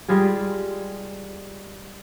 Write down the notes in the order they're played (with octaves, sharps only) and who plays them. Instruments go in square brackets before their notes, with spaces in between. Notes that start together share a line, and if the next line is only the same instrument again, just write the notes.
[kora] G3 G#3 F4 G#4